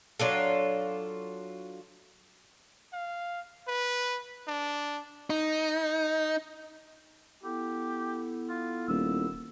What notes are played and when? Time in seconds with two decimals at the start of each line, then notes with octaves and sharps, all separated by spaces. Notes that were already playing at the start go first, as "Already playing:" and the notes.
0.20 F#3 D4 F4 A4
2.93 F5
3.68 B4
4.48 D4
5.30 D#4
7.44 B3 E4 G4 A4
8.50 F4
8.89 D#1 E6